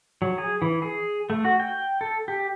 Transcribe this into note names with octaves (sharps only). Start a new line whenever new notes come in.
F#3
G#4
E3
G#4
A3
F#4
G5
A4
G4